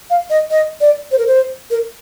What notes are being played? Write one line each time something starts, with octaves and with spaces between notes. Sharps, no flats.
F5
D#5
D#5
D5
C5
A#4
C5
A#4